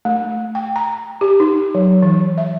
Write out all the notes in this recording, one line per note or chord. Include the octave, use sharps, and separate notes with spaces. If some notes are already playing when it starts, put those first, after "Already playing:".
A3
G5
A#5
G4
D#4
F#3
E3
E5